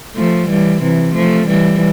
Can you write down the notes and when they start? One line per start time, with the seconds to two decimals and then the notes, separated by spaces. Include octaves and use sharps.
0.16 F3 A3
0.49 E3 G3
0.82 C3 E3
1.15 F3 A3
1.48 E3 G3